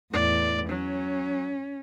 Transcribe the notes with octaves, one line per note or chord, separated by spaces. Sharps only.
E2 A2 D5
F#3 C#4